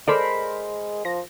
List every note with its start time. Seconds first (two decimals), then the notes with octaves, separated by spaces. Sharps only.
0.08 G#3 A4 A#4 C5 D5 B5
1.05 F3 A#6